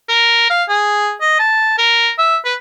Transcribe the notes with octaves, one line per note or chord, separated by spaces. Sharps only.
A#4
F5
G#4
D#5
A5
A#4
E5
B4